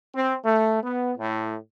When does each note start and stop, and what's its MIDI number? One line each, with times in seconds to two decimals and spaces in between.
0.15 0.35 60
0.45 0.80 57
0.82 1.12 59
1.18 1.56 45